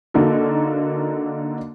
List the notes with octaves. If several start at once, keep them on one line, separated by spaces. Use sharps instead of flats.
D3 A#3 D#4 F#4 A4